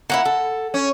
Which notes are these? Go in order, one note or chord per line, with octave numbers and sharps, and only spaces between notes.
A#3 C#4 E4 F#5
A4
C#4